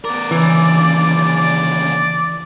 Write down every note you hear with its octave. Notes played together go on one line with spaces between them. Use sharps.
B3 A#4 D5
D#2 C#3 E3
D5